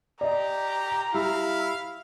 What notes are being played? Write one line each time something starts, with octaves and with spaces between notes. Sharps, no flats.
G4 D5 D#5 A#5
G3 E4 F5